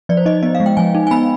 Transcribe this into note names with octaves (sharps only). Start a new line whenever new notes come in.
F3 D5
C5
D#4 D#5
B3 D#5
F5
G#3
G5
F3 G#5
D#4
G#5
B3 B5